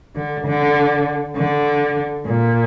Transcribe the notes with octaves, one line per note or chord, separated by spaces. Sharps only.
D3
D3
D3
A#2